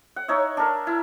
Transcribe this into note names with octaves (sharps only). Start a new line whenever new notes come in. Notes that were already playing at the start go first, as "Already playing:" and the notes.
F#5
D#4 C#5 E5
D4 A#4
E4